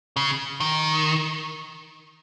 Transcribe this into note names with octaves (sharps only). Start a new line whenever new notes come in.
C#3
D#3